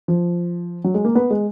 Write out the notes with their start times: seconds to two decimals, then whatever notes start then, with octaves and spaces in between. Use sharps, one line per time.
0.08 F3
0.84 F#3
0.94 G#3
1.05 A#3
1.15 B3
1.31 G#3